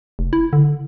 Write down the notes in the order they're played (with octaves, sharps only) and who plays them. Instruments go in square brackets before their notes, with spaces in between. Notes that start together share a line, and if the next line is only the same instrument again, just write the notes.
[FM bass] F1
E4
D3